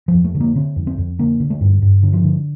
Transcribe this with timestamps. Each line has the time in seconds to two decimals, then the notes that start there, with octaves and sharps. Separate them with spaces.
0.08 F3
0.14 F2
0.24 A3
0.35 D3
0.40 A#3
0.55 D3 C4
0.76 F2
0.87 C4
0.98 F2
1.19 D3 A#3
1.40 D3
1.50 A3
1.61 G2
1.82 G2
2.03 D3
2.13 F3
2.24 D3